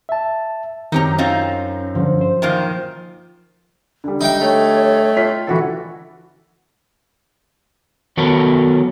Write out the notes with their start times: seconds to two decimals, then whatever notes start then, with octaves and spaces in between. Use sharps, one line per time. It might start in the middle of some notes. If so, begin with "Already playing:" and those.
0.09 E5 A5
0.92 F#2 D#3 C4 D#4 G4 A#4 A#5
1.18 C4 C#4 D#4 F4
1.95 G2 D3 F3 C#4
2.21 C5
2.42 A#2 D#3 F4
4.04 D3 G3
4.21 D#4 E5 G5
4.41 A3 C#5
5.17 F4 B6
5.47 D3 E3 F#4 A4
8.17 D#3 F#3 B3 A4 A#4 C#5